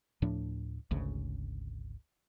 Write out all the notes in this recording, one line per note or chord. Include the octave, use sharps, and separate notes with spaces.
D2 A2 F3 D4
G#1 D2 C#3